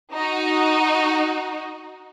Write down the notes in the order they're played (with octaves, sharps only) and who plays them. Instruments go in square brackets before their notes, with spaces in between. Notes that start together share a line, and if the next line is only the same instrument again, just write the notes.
[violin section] D#4 F#4